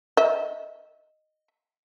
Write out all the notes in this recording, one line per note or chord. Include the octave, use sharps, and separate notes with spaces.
D#5 E5